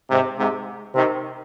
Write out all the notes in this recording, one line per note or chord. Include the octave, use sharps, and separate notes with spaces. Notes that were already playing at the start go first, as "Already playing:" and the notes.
G#2 C3
G#2 C3
C3 D#3